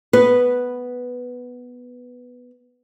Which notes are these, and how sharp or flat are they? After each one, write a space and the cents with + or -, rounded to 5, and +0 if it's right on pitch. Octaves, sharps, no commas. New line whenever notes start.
B3 +0 B4 +0